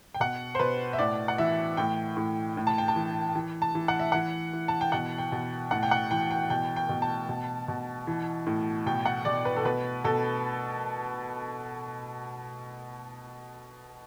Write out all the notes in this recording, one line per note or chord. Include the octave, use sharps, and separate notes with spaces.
G5
B2 F#5
C5
B2 B4
E5
A2 D5
F#5
E3 E5
A2 G5
A2
A2
A5
G5
A5
E3
E3
A5
E3
F#5
E5
E3 F#5
E3
A5
G5
B2 F#5
G5
B2
A2 F#5
G5
F#5
E3 G5
G5
B2 G5
G5
B2
A5
B2
B2
E3
A2
B2 G5
F#5
B2 D5
B4
A4
B2 B4
B2 A4